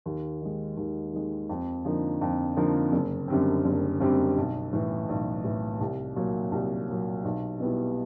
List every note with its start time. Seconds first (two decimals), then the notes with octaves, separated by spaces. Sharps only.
0.06 D#2
0.41 D#3 G#3
0.77 D#2
1.13 D#3 G#3
1.49 F2
1.85 D3 F3 A#3 D#4
2.21 F2
2.57 D3 F3 A#3 D#4
2.92 F#1
3.28 F#2 D3 G3 C4
3.64 F#1
4.00 F#2 D3 G3 C4
4.37 B1
4.73 A2 E3
5.09 B1
5.44 A2 E3
5.81 C2
6.16 A#2 F#3
6.52 C2
6.88 A#2 F#3
7.25 B1
7.60 B2 G3 B3 E4